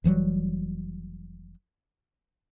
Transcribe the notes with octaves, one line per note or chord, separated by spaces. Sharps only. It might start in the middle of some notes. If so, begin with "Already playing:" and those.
F1 E3 F#3 G3